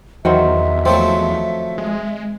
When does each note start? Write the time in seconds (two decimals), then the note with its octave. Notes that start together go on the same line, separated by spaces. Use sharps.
0.25 E2 D#3 F#3 C4 E5
0.86 F3 F#3 A3 C4
1.78 G#3